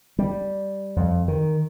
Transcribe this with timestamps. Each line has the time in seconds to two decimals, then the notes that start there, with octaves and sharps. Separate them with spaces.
0.19 G3
0.96 F2
1.28 D#3